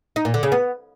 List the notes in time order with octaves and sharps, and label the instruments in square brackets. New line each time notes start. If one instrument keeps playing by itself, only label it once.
[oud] D#4
A#2
D3
C#3
B3